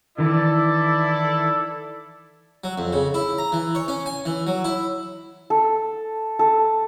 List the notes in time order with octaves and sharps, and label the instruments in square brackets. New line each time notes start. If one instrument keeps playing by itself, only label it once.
[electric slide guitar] D#3 E3 [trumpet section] E4 A4 D5
[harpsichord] F#3
F2
C#3
E4
A#5
E3
C#5
C#4
G#5
E3
F#3
E4
[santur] A4
A4